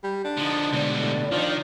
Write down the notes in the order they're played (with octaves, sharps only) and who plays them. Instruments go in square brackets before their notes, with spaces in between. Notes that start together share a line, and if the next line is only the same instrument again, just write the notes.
[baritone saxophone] G3
D4
[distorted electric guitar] D3 F3 [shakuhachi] D#4
[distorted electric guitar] G#2 G3 [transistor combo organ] B2 D3 [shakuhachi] D5
[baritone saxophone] A2
[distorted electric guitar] D#3 [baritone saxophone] F3 [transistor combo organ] D4 D#4 F4